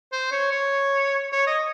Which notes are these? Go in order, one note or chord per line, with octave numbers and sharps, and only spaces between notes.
C5
C#5
C#5
C#5
D#5